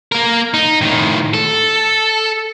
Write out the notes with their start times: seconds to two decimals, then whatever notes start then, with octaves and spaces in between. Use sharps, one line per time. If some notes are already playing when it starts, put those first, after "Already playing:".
0.12 A#3 A#4
0.54 D#4
0.81 A2 D#3
1.34 A4